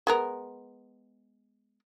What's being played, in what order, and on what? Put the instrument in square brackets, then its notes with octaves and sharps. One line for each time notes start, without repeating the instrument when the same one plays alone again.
[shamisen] G#3 B3 A#4